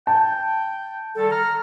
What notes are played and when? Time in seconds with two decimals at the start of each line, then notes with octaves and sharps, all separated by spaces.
0.07 G5 A5
1.16 D#3 G3 A4
1.31 A#5 F6